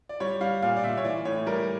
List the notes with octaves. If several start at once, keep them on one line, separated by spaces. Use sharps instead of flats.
D5
G3 C#5
G3 F5
A#2 F5
D5
A#2 E5
C#5
E3 D5
A2 C#5
G3 A#4